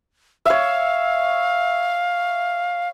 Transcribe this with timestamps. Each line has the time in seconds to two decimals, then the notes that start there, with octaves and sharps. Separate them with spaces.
0.46 C#5 E5 F5